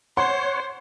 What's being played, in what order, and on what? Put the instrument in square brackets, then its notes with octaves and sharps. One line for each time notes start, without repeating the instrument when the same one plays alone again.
[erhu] C5 [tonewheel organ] C#5 [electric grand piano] F#5 [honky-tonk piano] C6